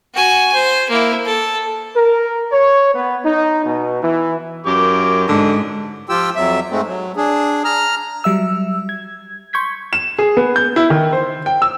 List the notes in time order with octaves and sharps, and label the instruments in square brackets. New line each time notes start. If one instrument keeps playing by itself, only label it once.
[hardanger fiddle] F#4 G#5
C5
A#3 E4
A4
[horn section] A#4
C#5
B3
D#4
B2
E3
[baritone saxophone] F#2 [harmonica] G4 A#4 D6
[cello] G#2 [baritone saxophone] D3
[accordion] F3 F4 G4 G5 E6
F2 F#3 E5
G#2 G#3 A3 C4
F#3
D4 G#4
A#5 F6
[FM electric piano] F#3 G3 E5 E6
G#6
C6 C#6 G6 G#6 B6
[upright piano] E7
G#4
B3
G6
E4
D#3
C5
G5
E6